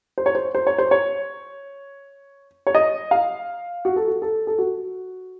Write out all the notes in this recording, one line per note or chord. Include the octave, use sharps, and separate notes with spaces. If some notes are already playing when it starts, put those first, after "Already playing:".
C5
C#5
C5
C5
C#5
C5
C#5
C#5
D#5
F5
F#4
A4
F#4
A4
A4
F#4